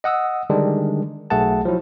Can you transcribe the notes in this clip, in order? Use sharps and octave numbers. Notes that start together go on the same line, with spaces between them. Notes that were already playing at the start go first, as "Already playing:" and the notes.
D#5 F#5 D#6 E6
D3 D#3 G3 G#3 D4
B1 A3 G#4 F#5 A5
F3 F#3 E4